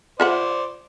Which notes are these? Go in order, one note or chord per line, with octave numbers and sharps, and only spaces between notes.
F4 C5 D5 E5 F#5